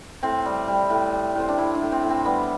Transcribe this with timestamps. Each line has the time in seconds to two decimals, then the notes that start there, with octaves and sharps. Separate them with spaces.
0.23 A2 C4
0.46 G3
0.68 G3
0.90 A2
1.13 G3
1.35 A2 C4
1.49 D4
1.58 A2 E4
1.75 D4
1.81 A2
1.92 C4
2.04 A2
2.09 C4
2.25 G3 B3